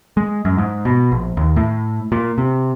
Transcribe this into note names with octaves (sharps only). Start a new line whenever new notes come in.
G#3
F#2
G#2
B2
A#1
D#2
A2
A#2
C3